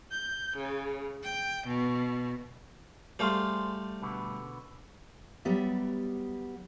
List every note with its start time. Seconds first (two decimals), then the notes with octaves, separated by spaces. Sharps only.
0.11 G6
0.57 C#3
1.22 G5
1.67 B2
3.19 G3 A3 G#4 C5 F5
4.02 B2 D3 B3
5.45 F#3 G3 B3 G4 D5 E5